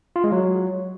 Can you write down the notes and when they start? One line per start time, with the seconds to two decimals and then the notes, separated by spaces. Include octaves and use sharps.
0.16 F4
0.24 G#3
0.32 F#3